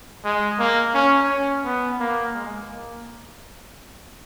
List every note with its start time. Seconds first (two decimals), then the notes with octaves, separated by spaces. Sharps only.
0.25 G#3
0.59 A#3
0.94 C#4
1.30 C#4
1.65 B3
2.00 A#3
2.35 G#3
2.70 A#3